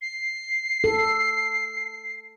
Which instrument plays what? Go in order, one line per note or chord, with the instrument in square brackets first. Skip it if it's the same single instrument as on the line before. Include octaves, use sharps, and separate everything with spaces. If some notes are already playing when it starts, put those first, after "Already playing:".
[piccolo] C7
[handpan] A4